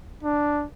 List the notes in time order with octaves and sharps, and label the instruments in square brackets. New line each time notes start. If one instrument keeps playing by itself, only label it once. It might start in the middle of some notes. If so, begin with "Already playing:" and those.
[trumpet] D4